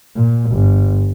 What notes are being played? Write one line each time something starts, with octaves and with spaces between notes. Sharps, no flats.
A#2
G1